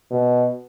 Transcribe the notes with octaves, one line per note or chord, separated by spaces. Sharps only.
B2